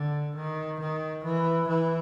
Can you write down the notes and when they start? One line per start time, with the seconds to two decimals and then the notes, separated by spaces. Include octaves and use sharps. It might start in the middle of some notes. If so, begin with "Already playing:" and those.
Already playing: D3
0.36 D#3
0.80 D#3
1.24 E3
1.68 E3